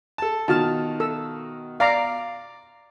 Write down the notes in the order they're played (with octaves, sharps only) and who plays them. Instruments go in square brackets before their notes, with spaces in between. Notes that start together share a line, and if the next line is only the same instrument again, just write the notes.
[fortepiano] A4 A5
[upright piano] B2 F4 F#4 [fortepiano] D#3 F6 [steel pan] A5
[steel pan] A4 E6
[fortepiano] D5 [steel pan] F5 A#5 D6